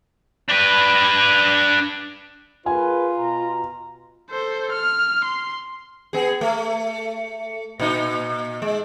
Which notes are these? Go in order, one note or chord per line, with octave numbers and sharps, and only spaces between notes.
D4 B4
F4 G#4 A#4 B4 G#5
B2 A#5
A4 C5
F6
C6
B3 G#4
A3
A#2 D#4
G#3